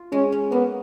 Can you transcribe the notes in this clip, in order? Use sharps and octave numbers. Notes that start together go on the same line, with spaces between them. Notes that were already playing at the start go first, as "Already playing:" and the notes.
Already playing: F4
G#3 C#4
C#4
A#3 B3